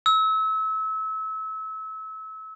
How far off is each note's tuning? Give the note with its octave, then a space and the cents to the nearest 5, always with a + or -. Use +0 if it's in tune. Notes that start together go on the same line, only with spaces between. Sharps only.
E6 -30